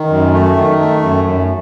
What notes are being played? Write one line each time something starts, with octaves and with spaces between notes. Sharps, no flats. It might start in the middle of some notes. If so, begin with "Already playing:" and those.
Already playing: D#3
F#2
A3
D#3
A3
F#2
F#2